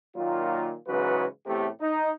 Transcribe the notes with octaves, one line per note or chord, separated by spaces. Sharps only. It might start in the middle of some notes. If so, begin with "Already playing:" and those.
A#2 D#3 F#3 A#3 F4
G#2 C#3 E3 F#3 F#4 B4
E2 A2 C3 A3 G4
D#4